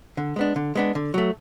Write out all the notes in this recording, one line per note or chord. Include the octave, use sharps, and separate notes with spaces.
D3
G#3 B3 D4
D3
G#3 B3 D4
D3
F#3 A3